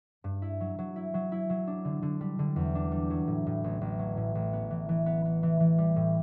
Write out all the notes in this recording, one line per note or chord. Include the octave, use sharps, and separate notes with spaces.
G2
E4
F#3
F#3
E4
F#3
E4
F#3
D4
D3
D3
G3
D3
E2
D4
G3
F#3
A2
A2
A1
A1
F#3
A2
A1
B3
E3
E3
B3
B3
E3
E3
G3
A2